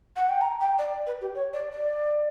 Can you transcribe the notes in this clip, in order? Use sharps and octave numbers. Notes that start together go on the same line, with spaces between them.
F#5
G5
A#5
G5
D5
B4
G4
C#5
D5
D5